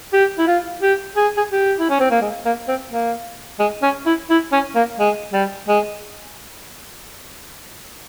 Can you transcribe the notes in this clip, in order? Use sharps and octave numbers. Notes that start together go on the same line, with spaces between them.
G4
E4
F4
G4
G#4
G#4
G4
E4
C#4
C4
A#3
G#3
A#3
C4
A#3
G#3
C#4
E4
E4
C#4
A#3
G#3
G3
G#3